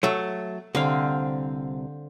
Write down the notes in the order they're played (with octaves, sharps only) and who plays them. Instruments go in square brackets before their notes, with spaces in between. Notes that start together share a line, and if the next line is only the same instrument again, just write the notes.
[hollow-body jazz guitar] F#3 A3
[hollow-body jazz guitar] C2 [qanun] D3 C4 F5